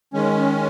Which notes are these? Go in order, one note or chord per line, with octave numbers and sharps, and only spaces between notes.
D#3 G#3 C#4